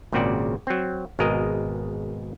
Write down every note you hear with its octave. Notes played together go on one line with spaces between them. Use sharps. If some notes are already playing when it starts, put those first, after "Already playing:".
G#1 A#2 C#3 C4 F#4 D5
F#3 C4
G#1 B2 G#3 A#4 D#5